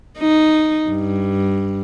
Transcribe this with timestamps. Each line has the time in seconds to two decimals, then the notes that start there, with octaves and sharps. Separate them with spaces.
0.19 D#4
0.90 G2